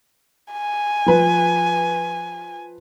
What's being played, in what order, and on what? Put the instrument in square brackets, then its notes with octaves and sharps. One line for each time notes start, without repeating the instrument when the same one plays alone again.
[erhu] G#5
[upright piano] F3 B4